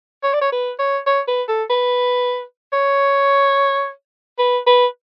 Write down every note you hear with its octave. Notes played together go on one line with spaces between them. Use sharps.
C#5
D5
C#5
B4
C#5
C#5
B4
A4
B4
C#5
B4
B4